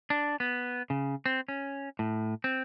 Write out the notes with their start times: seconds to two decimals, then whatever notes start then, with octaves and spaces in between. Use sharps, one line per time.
0.10 D4
0.40 B3
0.90 C#3
1.26 C4
1.48 C#4
1.99 A2
2.44 C4